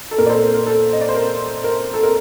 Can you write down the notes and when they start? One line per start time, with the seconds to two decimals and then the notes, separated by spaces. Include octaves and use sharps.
0.11 A4
0.18 A#2 A#4
0.26 D5
0.29 A4 C5
0.42 A#4
0.54 A#4
0.66 A4
0.93 D#5
1.01 D5
1.09 C5
1.15 A#4
1.64 A#4
1.94 A4
2.03 A#4